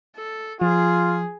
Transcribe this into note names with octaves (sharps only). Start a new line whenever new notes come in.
A4
F3 F4 G#4